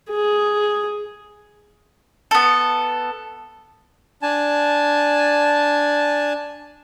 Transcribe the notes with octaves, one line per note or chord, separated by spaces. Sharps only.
G#4
B3 A4
D4 G#5 A5